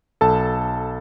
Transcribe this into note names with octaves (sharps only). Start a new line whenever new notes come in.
B1 A4 A5